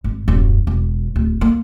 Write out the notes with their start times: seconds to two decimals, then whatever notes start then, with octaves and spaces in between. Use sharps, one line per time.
0.04 G#1
0.28 D#1 F#2
0.67 E1
1.16 D1
1.41 A#3